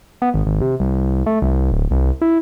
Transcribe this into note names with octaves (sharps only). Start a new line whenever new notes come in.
B3
G#1
G#1
C3
C2
A3
C2
C2
D1
C2
E4